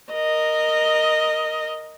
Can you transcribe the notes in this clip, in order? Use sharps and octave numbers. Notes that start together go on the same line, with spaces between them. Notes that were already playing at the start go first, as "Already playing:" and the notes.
A#4 D#5